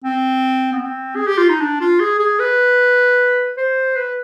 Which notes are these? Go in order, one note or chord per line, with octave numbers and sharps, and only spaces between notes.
C4
B3
C4
G#4
G4
F4
D#4
D4
F4
G#4
G#4
B4
C5
B4